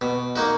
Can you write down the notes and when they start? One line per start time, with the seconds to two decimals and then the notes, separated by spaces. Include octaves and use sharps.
0.01 B2
0.36 A#3 D#4 F#4